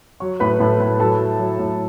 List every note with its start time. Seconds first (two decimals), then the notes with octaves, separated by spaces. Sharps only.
0.20 F#3 C#5 C#6
0.40 A2 B4 B5
0.60 A2 A4 A5
0.80 A2 B4 B5
1.00 F#3 A4 A5
1.19 F#3
1.39 F#3
1.59 A2